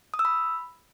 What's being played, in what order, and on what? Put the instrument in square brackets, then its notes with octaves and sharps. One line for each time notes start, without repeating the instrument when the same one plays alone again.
[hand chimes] D#6
E6
B5